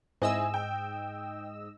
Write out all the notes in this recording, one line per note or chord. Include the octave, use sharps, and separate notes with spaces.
G#2 C4 E4 G#4 D#5 E6
G5